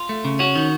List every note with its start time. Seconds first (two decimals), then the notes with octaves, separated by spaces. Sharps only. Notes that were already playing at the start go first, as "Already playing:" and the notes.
Already playing: F4
0.09 A3
0.25 C#3
0.39 C#4 F#4
0.56 D#3